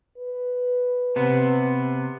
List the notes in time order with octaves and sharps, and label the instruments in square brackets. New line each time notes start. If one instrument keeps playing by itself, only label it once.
[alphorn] B4
[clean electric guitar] C3 B3